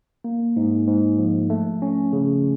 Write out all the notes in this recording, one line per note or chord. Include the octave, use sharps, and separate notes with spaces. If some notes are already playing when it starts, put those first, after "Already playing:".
A#3
G#2
G#2
F3
A3
C#4
C#3